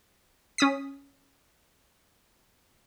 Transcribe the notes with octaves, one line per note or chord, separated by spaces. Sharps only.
C#4 D#6 B6